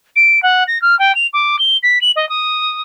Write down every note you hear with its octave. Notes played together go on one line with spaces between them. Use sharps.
D7
F#5
A#6
F6
G5
F7
D6
G7
B6
F#7
D#5
D#6